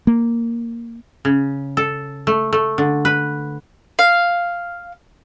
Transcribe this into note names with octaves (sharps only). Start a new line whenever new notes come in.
A#3
C#3
A4
A3
A3
D3
B4
F5